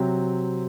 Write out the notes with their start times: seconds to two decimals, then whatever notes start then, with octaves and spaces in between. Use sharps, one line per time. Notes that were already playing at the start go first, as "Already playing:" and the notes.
Already playing: C3 F#3 C4